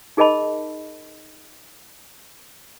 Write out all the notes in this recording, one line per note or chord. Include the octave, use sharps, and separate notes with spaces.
D#4 G#4 A#4 D#5 A5 B5